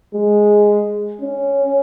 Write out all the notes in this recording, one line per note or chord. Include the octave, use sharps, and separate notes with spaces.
G#3
C#4